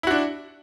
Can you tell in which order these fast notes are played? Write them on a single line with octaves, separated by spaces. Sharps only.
E4 F#4 D4